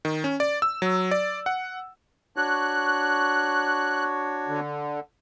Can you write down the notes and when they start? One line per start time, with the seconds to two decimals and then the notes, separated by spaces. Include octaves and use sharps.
0.05 D#3
0.24 C#4
0.40 D5
0.62 E6
0.82 F#3
1.11 D5
1.46 F#5
2.36 D4 F#4 C#5 F#6
4.48 D3